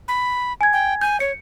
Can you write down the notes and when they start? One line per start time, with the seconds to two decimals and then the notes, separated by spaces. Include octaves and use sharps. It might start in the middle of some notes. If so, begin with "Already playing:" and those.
0.08 B5
0.61 G#5 G#6
0.73 G5
1.01 G#5 G6
1.20 C#5 C#7